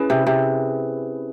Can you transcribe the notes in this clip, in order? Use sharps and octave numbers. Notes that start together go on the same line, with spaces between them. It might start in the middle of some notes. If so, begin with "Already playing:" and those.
Already playing: C#4 E4 G#4 B4
C3
C3